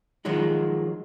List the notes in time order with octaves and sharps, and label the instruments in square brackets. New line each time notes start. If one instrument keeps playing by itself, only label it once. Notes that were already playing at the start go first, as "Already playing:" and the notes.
[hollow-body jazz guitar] D#3 F3 F#3 G#3 F#4